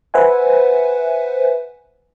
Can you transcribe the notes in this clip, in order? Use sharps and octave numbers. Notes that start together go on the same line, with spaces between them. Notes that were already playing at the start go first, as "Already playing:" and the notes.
B4 C5 E5 F#5 G#5